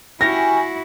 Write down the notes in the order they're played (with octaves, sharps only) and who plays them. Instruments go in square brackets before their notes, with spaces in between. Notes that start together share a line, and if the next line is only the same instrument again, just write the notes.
[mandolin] C#4 G4 G#5 [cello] E4 F#4 [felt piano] A#6